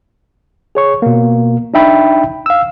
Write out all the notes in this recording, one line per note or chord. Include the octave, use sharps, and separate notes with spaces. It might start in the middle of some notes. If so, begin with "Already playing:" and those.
G#4 C#5 C#6
B2 A#3
D4 D#4 E5 G5 B5
F5 E6